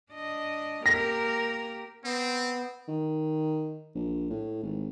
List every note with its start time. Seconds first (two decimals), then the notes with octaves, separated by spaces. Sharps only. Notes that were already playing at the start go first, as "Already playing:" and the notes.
0.13 D4 D#5
0.86 A#3 G4 A#4 A#6
2.05 B3 C4
2.88 D#3
3.95 A#1
4.30 A2
4.63 G#1